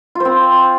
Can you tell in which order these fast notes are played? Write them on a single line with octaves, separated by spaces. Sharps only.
F4 C5 C4